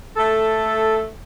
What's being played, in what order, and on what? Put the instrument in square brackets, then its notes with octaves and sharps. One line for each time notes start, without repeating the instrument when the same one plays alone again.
[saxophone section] A3 A4